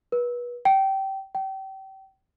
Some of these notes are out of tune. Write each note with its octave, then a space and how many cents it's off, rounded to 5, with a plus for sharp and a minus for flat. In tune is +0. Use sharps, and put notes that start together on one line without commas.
B4 -30
G5 -20
G5 -30